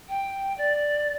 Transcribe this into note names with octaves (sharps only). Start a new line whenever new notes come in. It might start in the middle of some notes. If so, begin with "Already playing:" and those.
G5
D5